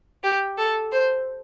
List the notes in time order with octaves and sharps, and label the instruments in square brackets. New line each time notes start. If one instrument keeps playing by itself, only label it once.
[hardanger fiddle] G4
A4
C5